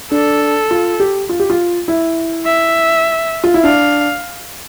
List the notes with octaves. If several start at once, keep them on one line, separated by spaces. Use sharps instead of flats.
D4 A4
F4
G4
F4
G4
F4
E4
E5
F4
E4
D4 F5